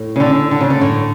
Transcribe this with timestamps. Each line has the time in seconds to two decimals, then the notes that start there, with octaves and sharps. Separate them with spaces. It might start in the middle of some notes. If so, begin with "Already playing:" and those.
Already playing: A2
0.16 C#3
0.20 D3
0.51 D3
0.60 C#3
0.70 D3
0.81 A2